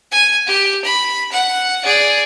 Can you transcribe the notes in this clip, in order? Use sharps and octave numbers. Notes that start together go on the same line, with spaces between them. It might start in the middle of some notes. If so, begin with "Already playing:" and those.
G#5
G4
B5
F#5
G#4 D5